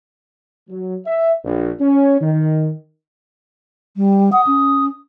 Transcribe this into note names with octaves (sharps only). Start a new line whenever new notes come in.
F#3
E5
A#1
C#4
D#3
G3
F#5 D#6
C#4